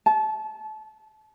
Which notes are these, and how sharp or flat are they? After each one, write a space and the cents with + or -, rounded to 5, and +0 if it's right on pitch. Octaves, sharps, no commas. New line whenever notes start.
A5 -25